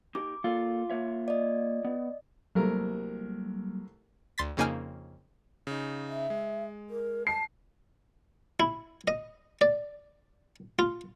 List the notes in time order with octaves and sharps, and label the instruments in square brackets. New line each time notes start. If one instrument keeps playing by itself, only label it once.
[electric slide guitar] D#4 G4 [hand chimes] D6
[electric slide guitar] A#3 A4 D5 [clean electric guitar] F4
[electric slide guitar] A#3 C#5 E5
[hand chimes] D5 D#5
[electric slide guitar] B3
[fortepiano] C2 A3 A#4 [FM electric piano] F#3 G3 A#3
[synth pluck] D2 C6 A6 B6
F2 C#3 A#3 D#4 G#5 F6
[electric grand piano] C#3 D#4
[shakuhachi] E5
[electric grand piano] G#3
[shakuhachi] A#4
[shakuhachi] A5 [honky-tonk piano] C7
[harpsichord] E4
D#5
D5
F4